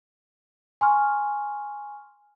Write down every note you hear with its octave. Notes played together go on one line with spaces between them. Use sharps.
G#5 C6 C#6 F6